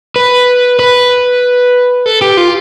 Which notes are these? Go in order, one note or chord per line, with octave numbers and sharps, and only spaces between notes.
B4
B4
A4
G4
F4